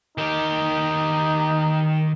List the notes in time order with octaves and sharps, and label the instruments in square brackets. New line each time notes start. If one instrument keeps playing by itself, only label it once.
[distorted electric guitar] D#3 G4 [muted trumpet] D#4